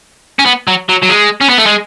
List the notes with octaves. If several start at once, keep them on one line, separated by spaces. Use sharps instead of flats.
C#4
B3
F#3
F#3
F#3
G#3
C#4
B3
A3
G#3